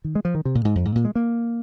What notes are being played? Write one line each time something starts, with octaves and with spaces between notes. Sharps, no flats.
D#3
G#3
F3
D#3
C3
A#2
G#2
F2
G#2
A#2
G#3
A#3